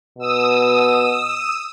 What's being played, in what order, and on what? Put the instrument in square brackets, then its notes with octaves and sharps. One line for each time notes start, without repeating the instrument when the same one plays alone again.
[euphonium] B2 [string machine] D#6 E6